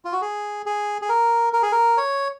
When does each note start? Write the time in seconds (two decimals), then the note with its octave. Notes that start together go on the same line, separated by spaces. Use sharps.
0.05 F4
0.12 F#4
0.22 G#4
0.66 G#4
1.02 G#4
1.09 A#4
1.53 A#4
1.63 G#4
1.72 A#4
1.97 C#5